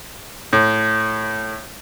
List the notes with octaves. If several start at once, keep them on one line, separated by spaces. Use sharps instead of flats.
A2